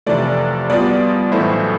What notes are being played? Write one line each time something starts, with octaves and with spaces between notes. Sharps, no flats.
F2 C3 E3 A3 D5
B2 G3 B3 F4 D5
B1 A2 E3 A3 E4 C5